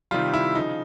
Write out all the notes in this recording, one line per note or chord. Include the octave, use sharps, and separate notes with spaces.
C3 D#3 G3 F4
E4
C#3 F3 D#4